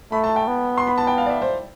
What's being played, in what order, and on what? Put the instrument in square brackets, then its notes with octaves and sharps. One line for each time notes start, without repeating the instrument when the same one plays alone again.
[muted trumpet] A3 [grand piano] B5
[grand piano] A5
G5
[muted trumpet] B3
[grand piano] C6
B5
A5
G5
F5
D5
E5
C5